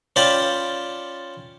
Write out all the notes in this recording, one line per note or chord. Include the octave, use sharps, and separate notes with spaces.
C#4 F4 D5 G5 A5 B5